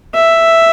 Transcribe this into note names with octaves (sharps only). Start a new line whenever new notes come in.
E5